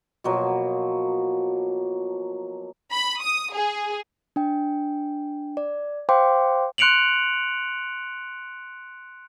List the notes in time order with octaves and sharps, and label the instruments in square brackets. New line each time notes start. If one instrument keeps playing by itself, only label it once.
[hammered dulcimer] B2 F3 F#3 A#3
[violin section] B5
D#6
G#4
[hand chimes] D4 G5
D5
C5 F5 G5 C6 D6
[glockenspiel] C6 F#6 C#7 D7 F7 F#7